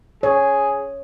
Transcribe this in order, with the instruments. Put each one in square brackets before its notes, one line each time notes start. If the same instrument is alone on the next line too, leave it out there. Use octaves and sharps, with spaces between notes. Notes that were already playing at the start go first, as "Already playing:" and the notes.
[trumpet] G#4 [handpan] C#5